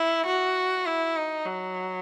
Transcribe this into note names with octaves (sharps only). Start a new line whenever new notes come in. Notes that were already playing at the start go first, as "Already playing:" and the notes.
Already playing: E4
F#4
E4
D#4
F#3